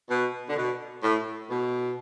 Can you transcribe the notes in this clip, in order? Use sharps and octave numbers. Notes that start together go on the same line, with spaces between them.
B2
D3
B2
A2
B2